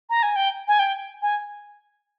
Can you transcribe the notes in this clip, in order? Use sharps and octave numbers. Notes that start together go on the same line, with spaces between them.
A#5
G#5
G5
G#5
G5
G#5